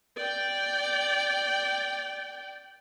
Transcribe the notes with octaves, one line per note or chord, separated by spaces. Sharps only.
D5 G5